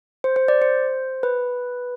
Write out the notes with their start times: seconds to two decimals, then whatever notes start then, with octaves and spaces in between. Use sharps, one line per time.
0.24 C5
0.36 C5
0.48 D5
0.62 C5
1.23 B4